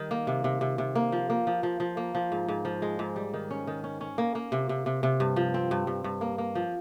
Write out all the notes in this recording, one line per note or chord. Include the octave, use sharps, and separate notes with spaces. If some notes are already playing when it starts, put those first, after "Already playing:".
Already playing: D#3 G3
A#3
C3
C3
C3
C3
A#3
F3
A#3
F3
F3
F3
A#3
F3
G#2
G#2
F3
G#3
G#2
G3
D#3
C#4
D#3
C#4
C#4
A#3
A#3
C3
C3
C3
C3
G2
F3
C4
G2
G2
G2
A#3
A#3
F3